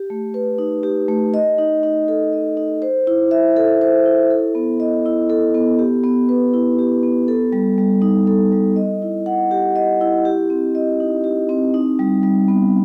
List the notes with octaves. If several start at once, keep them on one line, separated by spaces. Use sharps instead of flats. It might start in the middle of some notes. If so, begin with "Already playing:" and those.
Already playing: G4
A3
B4
D#4
G4
A3
D#5
D#4
D#4
A4
D#5
D#4
C5
E4
E5
A4
C5
E4
A4
B3
D#5
E4
A4
B3
G4
B3
B4
E4
G4
B3
A4
G3
G3
D#4
A4
G3
D#5
E4
F#5
G4
D#5
E4
G4
C4
D#5
D#4
G4
C4
D#4
G3
G3
B3